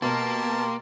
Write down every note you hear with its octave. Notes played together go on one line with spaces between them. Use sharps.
B2 A#3 G4 A#4 A5 C6